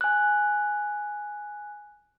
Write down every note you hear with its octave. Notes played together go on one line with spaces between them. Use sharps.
G#5 F#6